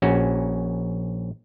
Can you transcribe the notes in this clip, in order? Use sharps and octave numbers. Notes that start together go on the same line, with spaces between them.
A#1 C#4 F#4